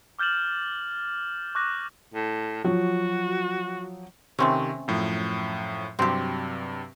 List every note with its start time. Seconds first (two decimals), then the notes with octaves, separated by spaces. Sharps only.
0.19 D6 F6 G6 A6 E7 F#7
1.55 C#6 D6 F#6 A#6
2.14 A2
2.64 F3 F#3 F#4
4.39 C3 D#3 A3 C4 C#4
4.88 F#2 A2 F3
5.99 G2 C3 F#3 C4 G4